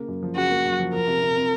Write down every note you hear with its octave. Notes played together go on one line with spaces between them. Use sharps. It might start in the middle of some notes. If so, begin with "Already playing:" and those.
Already playing: C#3 A#3
F#2
F3
C#3 F#4
A#3
F#2
F3
F3 A#4
C3
C3
C4